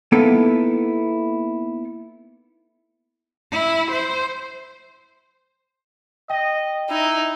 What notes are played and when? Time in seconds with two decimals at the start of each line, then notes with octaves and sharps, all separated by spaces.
0.12 A#3 B3 D#4 E4 A4 B4
3.52 E4
3.92 C5
6.30 D#5 G5
6.90 D#4 E4